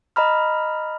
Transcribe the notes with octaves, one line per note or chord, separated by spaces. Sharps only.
D#5 A#5 B5 F6